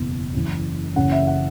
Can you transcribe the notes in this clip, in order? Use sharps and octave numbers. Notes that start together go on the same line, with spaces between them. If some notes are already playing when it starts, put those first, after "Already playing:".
Already playing: F#1 E2 B2
F#1 F#2 E3
F#1 F#2 C#3 E3 F#5
E5
F#5